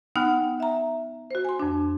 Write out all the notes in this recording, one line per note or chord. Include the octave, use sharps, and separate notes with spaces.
B3 D#4 F#5 G5 F6 F#6
E5 A#5
F#4 C5
G#5 C6
F2 D4